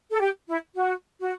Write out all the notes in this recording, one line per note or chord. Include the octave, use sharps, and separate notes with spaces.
A4
G4
E4
F#4
F#4